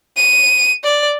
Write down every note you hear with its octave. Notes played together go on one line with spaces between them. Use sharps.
D#7
D5